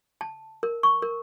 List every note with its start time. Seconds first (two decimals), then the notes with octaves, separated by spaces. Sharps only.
0.21 A5
0.63 A#4
0.83 C#6
1.02 A#4